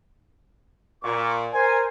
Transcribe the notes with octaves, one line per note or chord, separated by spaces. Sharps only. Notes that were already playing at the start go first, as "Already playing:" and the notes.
A#2 C#6 D6
A#4 C5 G#5